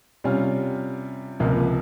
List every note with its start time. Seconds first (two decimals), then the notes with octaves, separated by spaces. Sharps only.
0.24 C3 G3 C#4 F4
1.40 C#2 C3 F3 A#3